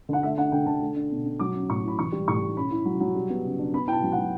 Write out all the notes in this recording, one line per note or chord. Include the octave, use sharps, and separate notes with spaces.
D3 F#5
A3 E5
D4 F#5
D3 G5
D3 A5
A3
D4
B2
B2
F#3 D6
C#4
A2 C#6
E4 B5
E3 C#6
G3
A2 C#6
A2
C#4 B5
E4
F#3
F#3
G3
B3
C#3
D4
B3 B5
E4 G5 A5
F#3
F#5
F#3